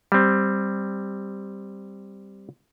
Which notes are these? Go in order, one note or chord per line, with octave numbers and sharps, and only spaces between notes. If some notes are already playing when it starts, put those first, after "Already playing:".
G3 C4